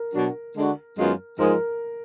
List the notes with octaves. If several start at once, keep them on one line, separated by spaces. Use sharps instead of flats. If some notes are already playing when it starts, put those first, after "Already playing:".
Already playing: A#4
B2 F#3 D4 F#4
D3 G#3 D4 F#4
F#2 D#3 G#3 B3 F4
G#2 F3 G#3 A#4